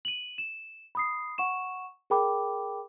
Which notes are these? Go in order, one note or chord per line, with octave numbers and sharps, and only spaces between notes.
D#7 F#7
E7
B5 D#6 C7
F#5 C#6 E7
G#4 A#4 G5 B5 D6